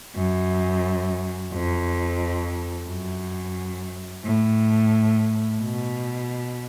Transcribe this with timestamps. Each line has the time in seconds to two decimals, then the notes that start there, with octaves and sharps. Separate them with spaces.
0.16 F#2
1.53 F2
2.88 F#2
4.24 A2
5.60 B2